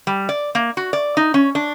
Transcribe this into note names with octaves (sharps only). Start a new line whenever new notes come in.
G3
D5
A#3
F#4
D5
D#4
C#4
D4